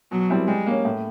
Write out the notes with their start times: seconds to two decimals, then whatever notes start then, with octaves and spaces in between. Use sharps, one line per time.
0.11 B2 F#3
0.30 G3 C4 E4
0.48 G3 G#3
0.66 A#3 C#4
0.85 A2